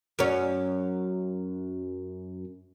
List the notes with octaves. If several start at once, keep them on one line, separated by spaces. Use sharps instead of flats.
F#2 C#4